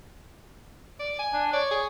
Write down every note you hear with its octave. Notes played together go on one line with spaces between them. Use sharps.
D5
G#5
D4
C#5 D5
G#4